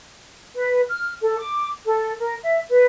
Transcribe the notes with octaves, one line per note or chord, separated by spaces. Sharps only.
B4
F6
A4
D6
A4
A#4
E5
B4